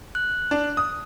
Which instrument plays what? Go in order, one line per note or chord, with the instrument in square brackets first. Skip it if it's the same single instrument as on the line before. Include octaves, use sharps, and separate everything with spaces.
[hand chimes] F#6
[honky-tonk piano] D4
D#6